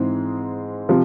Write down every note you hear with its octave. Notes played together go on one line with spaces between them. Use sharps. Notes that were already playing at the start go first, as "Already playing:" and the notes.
Already playing: G#2 E3 G#3 C4
C3 F3